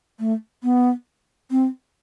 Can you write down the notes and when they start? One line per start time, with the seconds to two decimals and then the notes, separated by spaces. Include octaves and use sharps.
0.20 A3
0.63 B3
1.51 C4